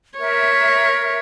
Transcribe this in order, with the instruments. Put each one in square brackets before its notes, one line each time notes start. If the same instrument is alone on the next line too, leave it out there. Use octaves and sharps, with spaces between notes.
[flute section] A#4 E5 [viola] C#5